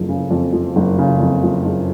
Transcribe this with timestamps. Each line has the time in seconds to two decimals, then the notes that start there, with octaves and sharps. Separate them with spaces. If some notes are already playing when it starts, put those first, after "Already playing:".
Already playing: F#1 F2 F3
0.09 C#3
0.31 F2
0.53 F3
0.76 F#1
0.98 C#3
1.20 F2
1.43 F3
1.65 F#1